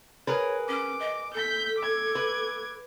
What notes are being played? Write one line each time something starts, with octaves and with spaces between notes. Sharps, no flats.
G#4 A#4 B4 C#5
C#4 D6
D#5
A4 G6 B6
D6 G#6
B4